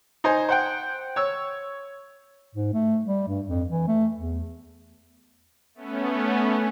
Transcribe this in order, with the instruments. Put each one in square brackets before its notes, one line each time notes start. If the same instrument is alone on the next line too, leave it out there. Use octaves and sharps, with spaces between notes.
[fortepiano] D#4 C5 G#5
C5 F#5 G5
C#5 E6
[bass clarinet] G#2
A3
G3
G2
F2
E3
A3
E2
[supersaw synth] A3 B3 C#4